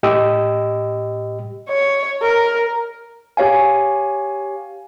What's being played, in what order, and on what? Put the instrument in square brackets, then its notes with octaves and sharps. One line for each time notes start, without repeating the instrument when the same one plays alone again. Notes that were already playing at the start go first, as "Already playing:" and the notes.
[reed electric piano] A2 G4 D#5 E6
[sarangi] C#5
A#4
[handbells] G4 C#5 F5 G#5